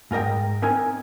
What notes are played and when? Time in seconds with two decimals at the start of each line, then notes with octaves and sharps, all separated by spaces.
0.11 G#2 F4 A#4 D#5 G5
0.62 C4 D#4 A#4 G#5